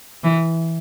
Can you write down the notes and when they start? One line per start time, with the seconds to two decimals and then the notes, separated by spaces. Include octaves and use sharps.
0.24 E3